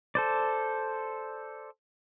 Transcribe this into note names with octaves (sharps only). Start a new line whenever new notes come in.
A4 C5 D5